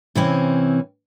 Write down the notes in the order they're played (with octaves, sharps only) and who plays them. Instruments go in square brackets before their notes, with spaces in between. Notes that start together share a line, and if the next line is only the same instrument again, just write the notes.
[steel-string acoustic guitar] C3 E3 C4 C#4